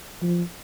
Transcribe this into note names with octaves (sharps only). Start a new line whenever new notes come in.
F3